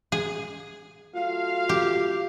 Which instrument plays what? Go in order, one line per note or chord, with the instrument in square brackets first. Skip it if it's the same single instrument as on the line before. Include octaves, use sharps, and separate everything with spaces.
[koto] G#4
[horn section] F#3 A3 F5 [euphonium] F4
[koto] G4